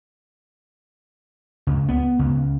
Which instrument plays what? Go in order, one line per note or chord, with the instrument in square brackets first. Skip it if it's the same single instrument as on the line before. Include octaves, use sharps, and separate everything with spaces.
[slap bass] C#2
B3
C#2